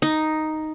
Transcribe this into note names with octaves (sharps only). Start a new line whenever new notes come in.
D#4